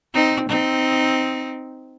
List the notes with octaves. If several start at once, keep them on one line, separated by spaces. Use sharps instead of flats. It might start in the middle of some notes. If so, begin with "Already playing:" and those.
C4 D#4
C4 D#4